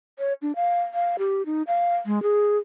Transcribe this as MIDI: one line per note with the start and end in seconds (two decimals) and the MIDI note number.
0.19 0.33 73
0.42 0.55 62
0.56 0.80 77
0.94 1.16 77
1.19 1.45 67
1.46 1.63 63
1.67 1.96 77
2.06 2.21 56
2.23 2.58 68